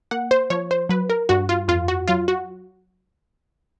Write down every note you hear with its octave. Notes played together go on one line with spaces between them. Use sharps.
A#3 F#5
C5
F3 C#5
C5
F#3 B4
A#4
G2 F#4
F4
F2 F4
F#4
F#3 F4
F#4